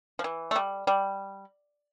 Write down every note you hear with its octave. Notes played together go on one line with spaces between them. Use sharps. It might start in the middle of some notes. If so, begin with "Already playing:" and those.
F3
E3
A3
G3
G3